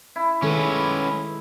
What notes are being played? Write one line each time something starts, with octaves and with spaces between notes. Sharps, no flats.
E4
D#3 G#3 C#4 A4 B4